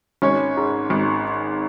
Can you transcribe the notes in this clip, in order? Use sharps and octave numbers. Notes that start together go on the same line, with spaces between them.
G#1 C#4 C#5
G#2
G#1